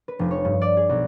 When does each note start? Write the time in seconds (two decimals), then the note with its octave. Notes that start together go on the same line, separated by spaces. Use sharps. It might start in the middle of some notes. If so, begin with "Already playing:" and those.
0.08 B4
0.19 F1
0.31 C#5
0.45 G2
0.61 D5
0.77 G#4
0.89 B1